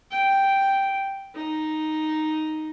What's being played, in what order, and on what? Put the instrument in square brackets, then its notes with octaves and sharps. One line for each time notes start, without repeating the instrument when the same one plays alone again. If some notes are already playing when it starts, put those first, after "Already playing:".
[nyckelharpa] G5
D#4